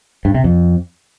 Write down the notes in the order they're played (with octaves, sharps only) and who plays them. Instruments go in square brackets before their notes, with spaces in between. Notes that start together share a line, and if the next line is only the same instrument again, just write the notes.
[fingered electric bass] G2
C3
F2